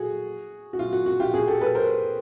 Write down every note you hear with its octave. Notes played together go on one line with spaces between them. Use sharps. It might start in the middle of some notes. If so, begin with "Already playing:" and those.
Already playing: F#4 G#4 A4
F#4
F4
F#4
F#4
F4 G4
F#4 G#4
G4 A4
A4 B4
A#4 C5